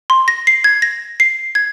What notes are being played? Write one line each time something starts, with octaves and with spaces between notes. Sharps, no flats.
C6
A#6
C7
G#6
A#6
C7
G#6